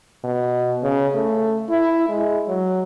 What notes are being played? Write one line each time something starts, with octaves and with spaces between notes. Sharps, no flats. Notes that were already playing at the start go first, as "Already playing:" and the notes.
B2
C#3
A3
E4
G#3
F#3